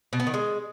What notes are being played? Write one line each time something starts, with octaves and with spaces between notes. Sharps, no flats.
B2
B3
D#3
G#3